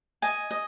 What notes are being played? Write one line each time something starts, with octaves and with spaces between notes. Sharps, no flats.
D#5 G#5
D#5